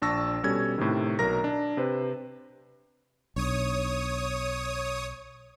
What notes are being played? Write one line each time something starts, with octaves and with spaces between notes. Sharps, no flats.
A#1 D4 A5 C#6 E6 A#6
B2 G3 C#4 A4 G#6
A2 C3 D#3
B1 F#3 A#4 A#5 A#6
D4
C3 B4 C5
B1 D4 C#5 D#6